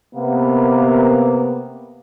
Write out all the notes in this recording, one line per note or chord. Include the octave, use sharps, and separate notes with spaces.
C3 A#3 B3